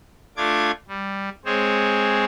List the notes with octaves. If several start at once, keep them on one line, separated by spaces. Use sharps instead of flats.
A3 D4 F4 D6 G#6
G3
G#3 C4 G#4 C5 C#5